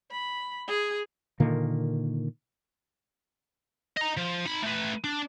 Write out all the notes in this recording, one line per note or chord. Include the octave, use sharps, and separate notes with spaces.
B5
G#4
A#2 D3 D#3 A#3
D#5 A#5
F3
D#4 B5
A3 B4
D4